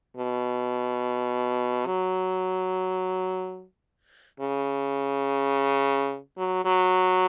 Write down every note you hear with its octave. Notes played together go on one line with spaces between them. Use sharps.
B2
F#3
C#3
F#3
F#3